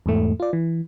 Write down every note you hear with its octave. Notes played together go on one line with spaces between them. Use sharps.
E2 G#2 A3
F4 D5
E3